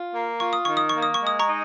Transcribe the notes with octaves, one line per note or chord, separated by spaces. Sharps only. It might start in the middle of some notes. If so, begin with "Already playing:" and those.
Already playing: F4
A#3
F4 C#6
D#6
D#3 C#6
D#6
C#6
A#3
D#6
C#6
G#3
D#6
A#5 C#6
D#4